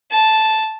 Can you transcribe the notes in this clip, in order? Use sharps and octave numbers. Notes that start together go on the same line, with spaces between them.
A5